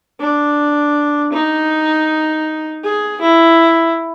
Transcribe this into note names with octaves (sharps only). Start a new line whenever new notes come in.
D4
D#4
G#4
E4